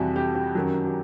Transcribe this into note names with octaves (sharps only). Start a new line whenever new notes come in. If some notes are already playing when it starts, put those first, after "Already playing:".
Already playing: F2 C3 E3 G3 F#4
G4
G4
F#2 D#3 F#3
G4